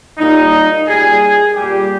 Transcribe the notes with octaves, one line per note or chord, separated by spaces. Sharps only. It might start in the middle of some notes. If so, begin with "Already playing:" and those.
A#2 G3 D#4
A#2 G3 G#4
A#2 G3 G4